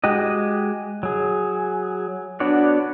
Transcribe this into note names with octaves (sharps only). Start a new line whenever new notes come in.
G#3 F#4 G4 D#5
F#3 G#4
B3 D4 F#4 C#5 D5